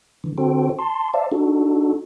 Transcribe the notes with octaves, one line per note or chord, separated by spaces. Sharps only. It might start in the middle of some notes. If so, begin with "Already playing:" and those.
D3 E3
D3 C4 F#4 A4 C5 G5
A5 C6
C5 D5 E5 F5 A5
D4 D#4 F#4 A4